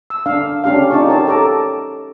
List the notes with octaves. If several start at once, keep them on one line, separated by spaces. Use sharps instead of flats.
E6
D4 F5
C#4 D4 G4 F5
C#4 D#4 F4 D5 A5 C#6
G4 A#4 C#5 A5
A4 A5 A#5 D6